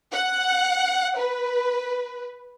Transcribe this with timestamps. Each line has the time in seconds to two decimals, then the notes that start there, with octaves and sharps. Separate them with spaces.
0.12 F#5
1.18 B4